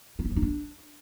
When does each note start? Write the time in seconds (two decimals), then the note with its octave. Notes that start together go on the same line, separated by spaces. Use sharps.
0.19 C4
0.25 E4
0.31 F3
0.36 D#4
0.42 D4